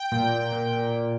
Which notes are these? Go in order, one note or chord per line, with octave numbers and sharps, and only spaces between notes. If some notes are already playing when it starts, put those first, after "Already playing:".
Already playing: G5
A#2
A#2
A#2
A#2
A#2